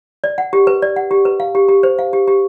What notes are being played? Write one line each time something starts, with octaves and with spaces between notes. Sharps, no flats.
D5
F#5
G4
B4
D5
F#5
G4
B4
F5
G4
G4
C5
F5
G4
G4